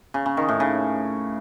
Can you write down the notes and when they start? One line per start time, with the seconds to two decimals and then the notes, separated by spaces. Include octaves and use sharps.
0.14 C#3
0.26 C#3
0.37 D#3
0.49 A2
0.60 C#3